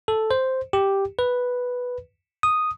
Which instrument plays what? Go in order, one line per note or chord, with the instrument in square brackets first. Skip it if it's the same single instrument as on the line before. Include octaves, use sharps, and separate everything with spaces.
[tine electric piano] A4
C5
G4
B4
D#6